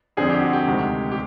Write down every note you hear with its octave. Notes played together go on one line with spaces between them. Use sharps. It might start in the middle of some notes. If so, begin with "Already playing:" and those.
F2 D3 G3 C4 G#4
G4
F#4
G4
D2 C3 D#3 G#3
G4